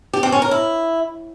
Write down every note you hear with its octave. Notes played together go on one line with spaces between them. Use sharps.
G4
C4
C#4
A#4
E4